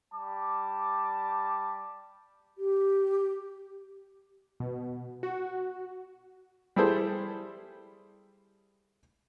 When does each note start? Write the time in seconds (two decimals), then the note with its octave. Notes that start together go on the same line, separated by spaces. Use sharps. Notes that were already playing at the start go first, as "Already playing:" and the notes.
0.14 G3 A5 D6
2.58 G4
4.60 B2
5.23 F#4
6.76 G3 E4 G#4 A4 C5